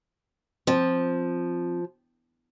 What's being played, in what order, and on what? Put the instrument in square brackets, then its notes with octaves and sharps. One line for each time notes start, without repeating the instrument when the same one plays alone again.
[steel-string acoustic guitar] F3 [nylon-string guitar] C4